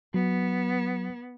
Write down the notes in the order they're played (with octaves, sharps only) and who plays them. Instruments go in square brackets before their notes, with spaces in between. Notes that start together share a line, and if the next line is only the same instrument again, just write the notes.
[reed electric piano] F#3 [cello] B3